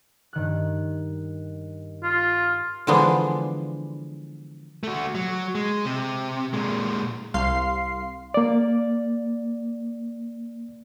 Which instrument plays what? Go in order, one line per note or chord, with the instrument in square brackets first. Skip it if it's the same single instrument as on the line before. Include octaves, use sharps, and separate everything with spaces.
[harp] G2 D#3 F#6
[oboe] F4
[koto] D3 E3 F3 G#3 B3 D4
[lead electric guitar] A3 F#4
F#3
G#3
C3
A#2 G#3
[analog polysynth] C2 F5 C6 C7
[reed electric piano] A#3 D5